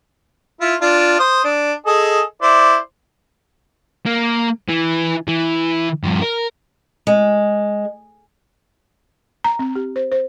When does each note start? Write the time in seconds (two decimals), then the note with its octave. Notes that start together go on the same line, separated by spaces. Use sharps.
0.61 E4 F4
0.81 D4 F4
1.20 C5 D#6
1.44 D4
1.86 G#4 A4 D#5
2.42 E4 C5 D5
4.06 A#3
4.68 E3
5.28 E3
6.04 G2 F3
6.22 A#4
7.07 G#3
9.44 A#5
9.59 C4
9.75 G4
9.96 C5
10.12 C5